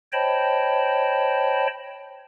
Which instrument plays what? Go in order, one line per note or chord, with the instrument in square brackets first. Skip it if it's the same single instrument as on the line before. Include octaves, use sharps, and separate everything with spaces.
[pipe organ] C5 C#5 D#5 G5 A5 B5